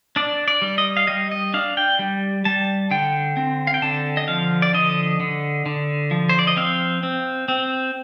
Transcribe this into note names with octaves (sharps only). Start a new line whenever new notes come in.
D4 D5
D5
G3
D#5
F5
G3 D#5
D#5
D4 F5
G5
G3
G3 A5
D3 G5
C4
F5
G5
D3 A5
D#5
F3 F5
D5
D3 D#5
D3
D3
F3
C5
D5
D#5
C4 F5
C4
C4